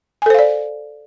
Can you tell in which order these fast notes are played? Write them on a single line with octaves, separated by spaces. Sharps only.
G#5 A4 C5 F5 D5